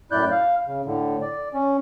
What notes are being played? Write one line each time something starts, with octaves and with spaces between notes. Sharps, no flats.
F#2 A2 E4 D5 F#6 G6
F5
C#3
A2 D3
D5
C#4